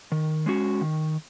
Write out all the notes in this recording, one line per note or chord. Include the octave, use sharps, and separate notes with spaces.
D#3
G#3 C#4 F#4
D#3